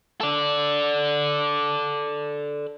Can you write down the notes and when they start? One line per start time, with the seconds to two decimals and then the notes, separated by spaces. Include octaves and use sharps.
0.21 A4 D5